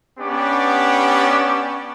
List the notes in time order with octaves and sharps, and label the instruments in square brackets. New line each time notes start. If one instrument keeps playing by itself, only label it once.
[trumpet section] B3 C#4 D4 G4 D5